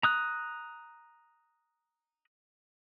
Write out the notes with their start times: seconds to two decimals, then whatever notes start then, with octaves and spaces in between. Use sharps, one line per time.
0.03 A#5 D#6 F#6